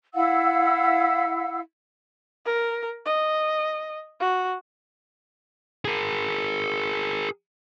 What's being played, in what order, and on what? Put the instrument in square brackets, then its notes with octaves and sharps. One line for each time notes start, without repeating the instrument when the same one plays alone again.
[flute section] E4 F5 F#5 E6
[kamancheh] A#4
D#5
F#4
[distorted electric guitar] G#4 A#4